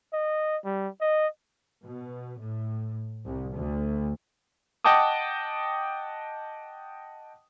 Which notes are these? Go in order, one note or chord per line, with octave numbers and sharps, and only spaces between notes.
D#5
G3
D#5
B2
A2
C2
D2
D#5 F#5 G5 A5 D6 D#6